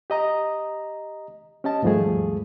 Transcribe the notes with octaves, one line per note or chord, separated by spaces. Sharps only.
G4 D#5 A#5 D#6
C#4 G4 D#5 A5
D#2 G#2 F3 G3 A3 G#4